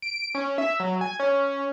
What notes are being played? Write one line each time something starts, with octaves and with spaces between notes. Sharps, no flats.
D7
C#4
E5
F#3
G#5
C#4